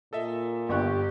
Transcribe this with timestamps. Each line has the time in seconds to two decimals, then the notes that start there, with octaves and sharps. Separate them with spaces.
0.13 A#2 A4 D#5 E5
0.69 G1 G4 C#6 F#6